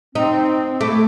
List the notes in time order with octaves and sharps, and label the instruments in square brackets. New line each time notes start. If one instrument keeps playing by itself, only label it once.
[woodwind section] C4 [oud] D#4
[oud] A3 [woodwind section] E4 D6